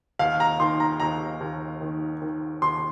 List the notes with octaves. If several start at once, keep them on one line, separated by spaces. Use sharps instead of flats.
D#2 F5
A#5
D#3 C6
A#5
D#2 A#5
D#2
D#3
D#3
D#2 C6